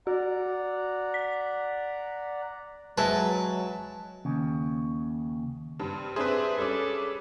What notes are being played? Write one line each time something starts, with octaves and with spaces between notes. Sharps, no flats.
F#4 D5 F#5 A#5
B6
F#3 G#3 G#4 B4 E5 A5
D#2 C#3
G2 C4
C4 D4 G#4 B4 C5 E5
G3 C#4 A4 D6